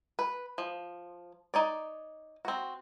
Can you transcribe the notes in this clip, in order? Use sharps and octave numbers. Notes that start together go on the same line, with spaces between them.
B4
F3
D#4 C#5 D5
C4 F#4